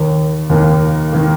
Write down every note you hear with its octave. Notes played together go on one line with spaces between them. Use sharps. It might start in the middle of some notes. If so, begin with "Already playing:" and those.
Already playing: D#2 D#3 A#3
D#2 D#3 A#3
D#3 A#3